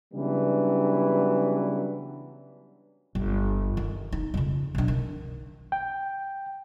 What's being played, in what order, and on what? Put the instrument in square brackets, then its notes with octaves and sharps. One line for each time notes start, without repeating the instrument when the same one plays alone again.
[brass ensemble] C#3 E3 F#3 G3 B3 D4
[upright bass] G1
D#3
D#4
F2 C#3
B1 D4
D#3
[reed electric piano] G5